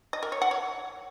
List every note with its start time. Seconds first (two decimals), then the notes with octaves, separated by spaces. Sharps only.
0.13 D#5
0.23 A#4
0.32 C#5
0.42 F#5
0.51 C#5